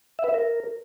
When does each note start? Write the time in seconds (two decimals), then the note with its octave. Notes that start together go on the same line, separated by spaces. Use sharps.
0.19 E5
0.24 B4
0.29 E5
0.34 A#4